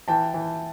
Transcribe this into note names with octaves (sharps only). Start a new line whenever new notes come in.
E3 G5 A5
E3